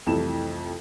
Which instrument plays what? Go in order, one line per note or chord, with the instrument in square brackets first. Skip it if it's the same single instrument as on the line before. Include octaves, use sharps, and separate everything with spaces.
[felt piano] C2 F2 E3 A3 E7